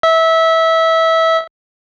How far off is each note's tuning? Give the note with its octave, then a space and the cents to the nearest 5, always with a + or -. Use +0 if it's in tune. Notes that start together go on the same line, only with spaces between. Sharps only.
E5 -20